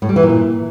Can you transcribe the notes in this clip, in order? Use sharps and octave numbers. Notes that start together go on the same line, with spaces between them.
A2
G3
E3
A#2